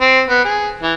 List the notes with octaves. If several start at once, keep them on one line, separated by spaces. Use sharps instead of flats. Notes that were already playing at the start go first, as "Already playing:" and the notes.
C4
B3
G#4
E3